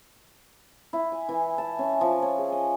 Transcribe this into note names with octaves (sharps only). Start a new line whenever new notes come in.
E4
G#5
E3
A5
C#4
F3
C#5
G#4
D#5